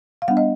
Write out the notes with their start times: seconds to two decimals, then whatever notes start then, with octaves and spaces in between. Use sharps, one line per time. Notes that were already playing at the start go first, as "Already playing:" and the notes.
0.22 F5
0.28 G3 B3 D4 F#5
0.37 D#5